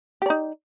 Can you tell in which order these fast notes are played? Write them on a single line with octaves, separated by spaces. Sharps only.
G4 D5 D#4